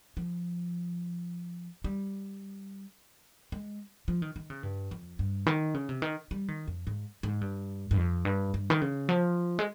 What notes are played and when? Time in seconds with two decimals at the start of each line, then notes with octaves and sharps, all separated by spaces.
0.17 F3
1.84 G3
3.52 G#3
4.08 F3
4.22 D#3
4.36 D#3
4.50 C#3
4.63 G2
4.91 F2
5.19 G2
5.46 D#3
5.74 C#3
5.89 C3
6.02 D#3
6.31 G3
6.48 D#3
6.67 F2
6.87 G#2
7.23 G#2
7.41 G2
7.91 G2
7.97 F2
8.25 G2
8.54 G2
8.70 D#3
8.81 C#3
9.09 F3
9.59 G#3